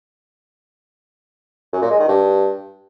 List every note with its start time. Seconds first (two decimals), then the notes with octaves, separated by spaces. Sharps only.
1.73 F#2
1.82 A#2
1.91 G#3
1.99 D#3
2.08 G2